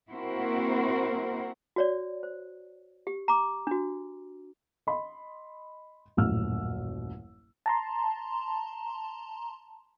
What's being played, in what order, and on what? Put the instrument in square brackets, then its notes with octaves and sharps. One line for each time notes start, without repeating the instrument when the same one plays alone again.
[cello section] A#3 C4 E4 F#4 A#4 C5
[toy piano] F#4 C#5 D5
C5
G4
A#5 D6
D4 F#4
[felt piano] D#5 B5 C6
D#1 A1 F#2 E6 F6
[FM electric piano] A5 A#5 C6